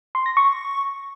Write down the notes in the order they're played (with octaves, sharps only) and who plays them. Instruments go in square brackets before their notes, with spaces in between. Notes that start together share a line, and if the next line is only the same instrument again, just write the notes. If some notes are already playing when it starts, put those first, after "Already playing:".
[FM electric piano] C6
A#6
C#6